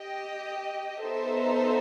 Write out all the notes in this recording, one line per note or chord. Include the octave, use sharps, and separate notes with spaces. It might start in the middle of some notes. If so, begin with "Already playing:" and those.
Already playing: G4 D#5 G5
B3 D#4 A4 C5 E5